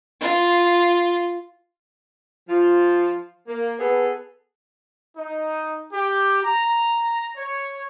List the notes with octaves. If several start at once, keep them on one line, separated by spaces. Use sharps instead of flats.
F4
F3 F4
A#3
B3 G#4 A4 B4
D#4
G4
A#5
C#5